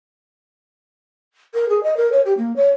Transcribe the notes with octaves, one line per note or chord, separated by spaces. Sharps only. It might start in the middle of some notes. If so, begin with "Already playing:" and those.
A#4
G#4
D#5
A#4
C#5
G4
A#3
C#5